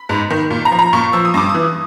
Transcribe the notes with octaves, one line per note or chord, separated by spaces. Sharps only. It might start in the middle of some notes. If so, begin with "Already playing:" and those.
Already playing: B5
G#2
D#3
A#2
A#5
F3
A#5
A#2 C#6
F3 E6
D#6
G2 D6
D#6
E3